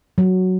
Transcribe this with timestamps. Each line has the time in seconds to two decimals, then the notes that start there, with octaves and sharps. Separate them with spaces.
0.18 F#3